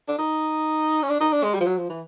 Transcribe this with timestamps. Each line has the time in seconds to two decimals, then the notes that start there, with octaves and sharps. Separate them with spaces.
0.09 D4
0.19 D#4
1.03 C#4
1.10 D4
1.21 D#4
1.32 D4
1.43 G#3
1.54 G3
1.60 F3
1.66 F#3
1.78 F3
1.89 E3